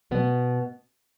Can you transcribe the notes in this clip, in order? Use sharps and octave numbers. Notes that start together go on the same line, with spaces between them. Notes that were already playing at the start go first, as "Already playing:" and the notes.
B2 B3